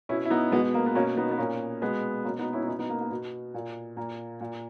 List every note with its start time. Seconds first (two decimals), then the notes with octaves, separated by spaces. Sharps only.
0.09 B2 C#4 E4
0.25 E4
0.30 B3 D#4
0.52 B2 G#3 B3
0.74 A#3
0.86 B3
0.95 B2 A#3 C#4
1.17 B3 D#4
1.31 B3
1.38 A#2 A#3 C#4
1.82 B2 G#3 B3
2.25 B2 A#3 C#4
2.39 B3 D#4
2.53 C#4 E4
2.63 D#4
2.68 B2 C#4 E4
2.79 B3 D#4
2.90 A#3
3.00 A#3
3.10 B2
3.54 A#2
3.97 A#2 A#3
4.41 A#2